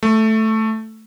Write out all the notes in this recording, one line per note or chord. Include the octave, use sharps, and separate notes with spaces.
A3